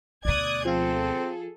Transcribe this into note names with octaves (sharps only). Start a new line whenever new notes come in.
D2 B2 D5 D#6 F#6 G#6
F3 C4 F4 G#4 A4